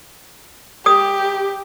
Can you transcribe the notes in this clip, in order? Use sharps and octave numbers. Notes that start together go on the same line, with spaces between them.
G4 D#6